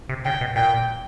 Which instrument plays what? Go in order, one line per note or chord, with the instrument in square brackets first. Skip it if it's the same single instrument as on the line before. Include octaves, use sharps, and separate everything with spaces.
[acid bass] C3
[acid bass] C#3 [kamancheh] G5
[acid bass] B2
[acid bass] A#2 [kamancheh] G5